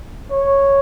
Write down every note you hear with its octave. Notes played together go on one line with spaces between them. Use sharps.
C#5